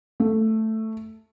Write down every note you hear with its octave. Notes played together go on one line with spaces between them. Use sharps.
A3